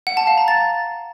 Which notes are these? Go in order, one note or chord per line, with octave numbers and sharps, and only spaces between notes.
F#5
A5
F5
A#5
A6